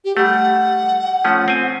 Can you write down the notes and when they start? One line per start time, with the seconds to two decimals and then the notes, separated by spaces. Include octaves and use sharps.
0.05 G4
0.17 G3 A3 F#5
1.25 F3 A3 C#4
1.48 C4 G#5